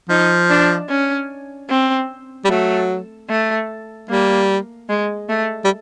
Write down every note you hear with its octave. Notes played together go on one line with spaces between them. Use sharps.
F3 D#4
D4
C#4
C4
G3
F#3 A3
A3
G3 A#3
G#3
A3
G3